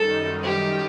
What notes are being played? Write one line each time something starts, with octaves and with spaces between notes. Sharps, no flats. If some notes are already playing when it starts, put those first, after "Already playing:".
Already playing: F#2 D#3 G3 D#4 A4
G4